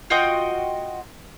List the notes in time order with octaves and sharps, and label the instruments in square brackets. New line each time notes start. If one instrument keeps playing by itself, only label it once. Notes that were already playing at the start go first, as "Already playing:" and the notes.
[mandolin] F4 F#4 D#5 G5